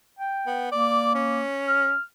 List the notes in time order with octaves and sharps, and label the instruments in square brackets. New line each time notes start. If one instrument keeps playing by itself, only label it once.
[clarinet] G5
[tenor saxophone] B3
[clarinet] A#3 [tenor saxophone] D5
[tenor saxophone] C#4
[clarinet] F6